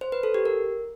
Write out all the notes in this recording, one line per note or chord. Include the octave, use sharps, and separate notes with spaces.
C5
B4
A4
G4
A#4